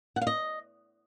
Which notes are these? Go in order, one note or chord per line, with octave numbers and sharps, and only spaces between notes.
F#5
F5
D#5